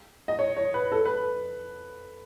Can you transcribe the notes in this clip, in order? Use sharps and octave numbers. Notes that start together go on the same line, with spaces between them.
D#5
C#5
C#5
B4
A4
B4